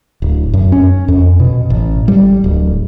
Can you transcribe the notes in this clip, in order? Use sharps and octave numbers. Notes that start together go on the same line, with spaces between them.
D1
F#2
C#4
F2
B2
A1
G3
D1